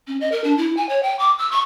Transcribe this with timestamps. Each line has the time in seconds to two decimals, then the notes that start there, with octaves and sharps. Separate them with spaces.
0.07 C#4
0.21 D#5
0.32 A#4
0.44 D4
0.57 E4
0.77 G#5
0.89 C#5
1.03 G5
1.19 D6
1.38 E6
1.51 C#6